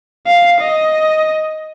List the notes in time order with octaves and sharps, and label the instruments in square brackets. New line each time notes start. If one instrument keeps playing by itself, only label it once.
[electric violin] F5
D#5